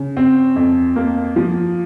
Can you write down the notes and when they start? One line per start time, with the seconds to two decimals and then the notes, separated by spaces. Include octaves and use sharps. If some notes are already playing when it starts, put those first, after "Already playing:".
Already playing: C#3
0.17 C4
0.56 F2
0.96 A#3
1.36 F3